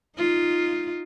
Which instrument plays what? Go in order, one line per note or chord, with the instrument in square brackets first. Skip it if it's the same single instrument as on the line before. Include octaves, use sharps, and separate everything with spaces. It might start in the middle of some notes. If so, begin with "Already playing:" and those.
[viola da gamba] D#4 F4